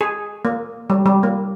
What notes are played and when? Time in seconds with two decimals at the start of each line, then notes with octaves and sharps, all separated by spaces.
0.01 G#4
0.45 A#3
0.90 G3
1.06 G3
1.23 A#3